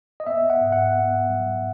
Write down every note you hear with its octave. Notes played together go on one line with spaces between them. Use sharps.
D#5
B3 E5
F#5
G#2
F#5
B3
F#3